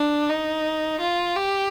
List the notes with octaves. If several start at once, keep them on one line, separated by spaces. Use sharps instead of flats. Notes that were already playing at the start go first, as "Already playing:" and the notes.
Already playing: D4
D#4
F4
G4